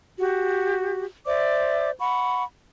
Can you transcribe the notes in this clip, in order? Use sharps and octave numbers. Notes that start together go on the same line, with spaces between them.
F#4 G4
C5 D5 E5 D6
F#5 B5 C#6